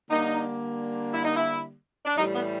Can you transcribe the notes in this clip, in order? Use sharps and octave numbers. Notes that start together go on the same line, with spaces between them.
D3 G3 A#3 D#4
E4
D#4
E4
D4
A2 E3 G3 D#4
B3